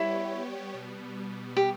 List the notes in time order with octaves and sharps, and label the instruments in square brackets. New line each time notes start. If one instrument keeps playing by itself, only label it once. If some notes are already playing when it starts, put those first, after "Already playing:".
Already playing: [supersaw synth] G3 B3 G4 C#5 [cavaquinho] E4
[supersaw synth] B2 G3 B3
[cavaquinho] G4